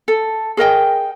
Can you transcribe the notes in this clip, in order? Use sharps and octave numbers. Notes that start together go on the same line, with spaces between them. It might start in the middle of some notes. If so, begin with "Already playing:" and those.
A4
G#4 A#4 D#5 G5